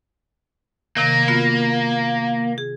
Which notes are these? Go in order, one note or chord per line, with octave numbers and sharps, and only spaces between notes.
C3 D#3 A#3
B3 F4 F#4
G#4